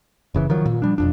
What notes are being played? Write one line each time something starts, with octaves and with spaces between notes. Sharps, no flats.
F#1 C#3 E3
D#3 F3 F#3
A#2
F3 G3 D4
E1 F2 D4